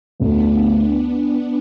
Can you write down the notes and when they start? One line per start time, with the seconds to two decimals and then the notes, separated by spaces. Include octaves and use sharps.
0.19 D2 D3 A3 B3 D4